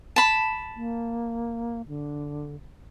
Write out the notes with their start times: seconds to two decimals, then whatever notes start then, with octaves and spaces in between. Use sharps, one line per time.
0.16 A5 B5
0.76 A#3
1.88 D3